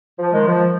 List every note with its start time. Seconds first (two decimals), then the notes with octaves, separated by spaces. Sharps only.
0.19 F3
0.33 D#3 G#3
0.48 F3